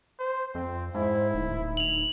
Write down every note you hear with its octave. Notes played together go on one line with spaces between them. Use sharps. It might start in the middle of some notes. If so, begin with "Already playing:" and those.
C5
F2 C4
G#2 E4 C5
D1 D#4
F7 F#7